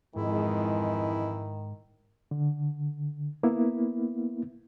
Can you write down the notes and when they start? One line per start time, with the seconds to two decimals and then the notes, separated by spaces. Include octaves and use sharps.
0.16 F2 G#2 D#3 E3 G#3 E4
2.31 D3
3.43 A#3 B3 E4